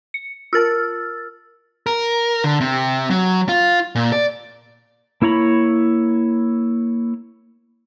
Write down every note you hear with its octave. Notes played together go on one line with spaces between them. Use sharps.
C#7
F4 A#4 A5 E6 F6 A6
A#4
D3
C3
F#3
F4
A#2
D5
A#3 E4 C#5 A#5 B5